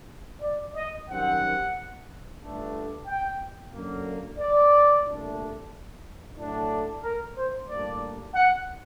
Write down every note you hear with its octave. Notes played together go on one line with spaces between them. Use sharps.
D5
D#5
F#2 D#3 G3 C4 F#5
G1 G2 D3 A3 D4
G5
F#2 D3 F#3 A#3
D5
C2 A#2 A3 D4
A2 F#3 A3 D4
A#4
C5
A2 G3 A#3 D4 D5
F#5